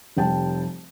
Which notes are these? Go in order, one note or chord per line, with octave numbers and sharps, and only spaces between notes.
F1 G3 G5 A5